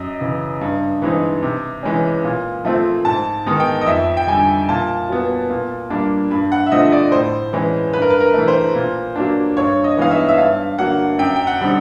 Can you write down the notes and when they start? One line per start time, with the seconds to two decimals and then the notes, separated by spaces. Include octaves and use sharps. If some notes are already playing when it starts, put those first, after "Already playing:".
Already playing: F#2 D#5
0.21 C#3 E3
0.61 G2
1.02 E3 G#3 C4 D#4
1.43 C3
1.83 E3 G#3 C#4
2.24 A#2
2.65 F3 A3 C4
3.05 G#2 A5
3.46 D#3 G#3 B3 D#4
3.60 G5
3.81 D#5
3.86 F2 E5
4.17 G5
4.27 D3 G3 G#5
4.69 A#2 A5
5.09 F#3 B3
5.50 A#2
5.90 G3 A#3 D4
6.31 G2 B5
6.52 F#5
6.66 E5
6.72 D3 F3 A3 C4 D#5
6.92 D5
7.12 A2 C5
7.53 E3 G#3 C#4
7.93 G2 B4
8.02 A#4
8.10 B4
8.20 A#4
8.34 E3 A3
8.48 C5
8.75 A#2
9.16 F#3 A#3 D4
9.57 G2 C#5
9.84 D#5
9.97 E3 G#3 B3 D#4 F5
10.11 E5
10.28 E5
10.38 G2 F5
10.78 D3 F#3 A#3 F#5
11.19 F#2 G5
11.36 G5
11.47 F#5
11.60 D3 G3 C4 D#4